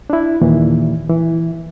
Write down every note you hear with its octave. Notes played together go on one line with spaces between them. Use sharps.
D4 E4
D#2 A#2 E3
E3